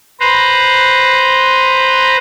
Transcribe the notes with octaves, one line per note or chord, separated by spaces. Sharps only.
B4 C5 A#5